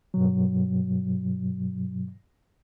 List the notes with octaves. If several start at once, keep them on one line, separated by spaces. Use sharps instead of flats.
G2 B2 F#3